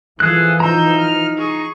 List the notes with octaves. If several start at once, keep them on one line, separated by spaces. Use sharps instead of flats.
E3 F3 G#4 A4 F#6
D#4 A#5 E6 G6
F6
G#4 C#6